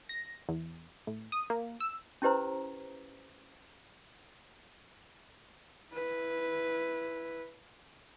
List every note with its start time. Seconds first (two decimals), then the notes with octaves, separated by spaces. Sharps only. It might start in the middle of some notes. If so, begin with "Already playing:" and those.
0.09 A#6
0.49 E2
1.07 A2
1.32 D#6
1.50 A#3
1.80 E6
2.22 C#4 E4 G4 B4 C5 A#5
5.92 E4 B4